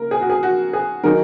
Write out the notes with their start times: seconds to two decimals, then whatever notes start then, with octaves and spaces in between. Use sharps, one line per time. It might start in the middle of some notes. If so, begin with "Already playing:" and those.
Already playing: C#3 A#3 A#4
0.11 G#4
0.21 F#4
0.30 G#4
0.43 F#4
0.73 G#4
1.03 D#3 F#3 D#4 G#4 A#4